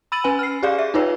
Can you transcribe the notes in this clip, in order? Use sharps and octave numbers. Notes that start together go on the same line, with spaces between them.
B5 E6 A6 D#7 F#7
C#4 B4 G#5
F6 C7
G4 G#4 D5 F5
E5
D#4 F4 B4 C#5 G5